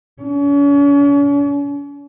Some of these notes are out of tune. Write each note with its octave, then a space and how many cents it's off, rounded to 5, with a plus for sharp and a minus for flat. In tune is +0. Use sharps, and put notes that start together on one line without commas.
C#4 +40